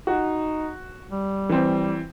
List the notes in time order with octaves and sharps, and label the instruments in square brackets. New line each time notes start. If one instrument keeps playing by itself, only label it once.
[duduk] D#4 [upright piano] F#4
[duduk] G3
[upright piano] E3 C4